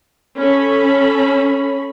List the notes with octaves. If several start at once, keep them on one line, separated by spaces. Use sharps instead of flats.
C#4 A4 B5